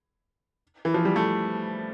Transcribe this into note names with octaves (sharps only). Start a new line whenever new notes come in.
E3
F3
G3
A3